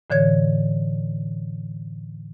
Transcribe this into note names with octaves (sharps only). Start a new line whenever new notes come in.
A2 D3 E3 C#5 G#6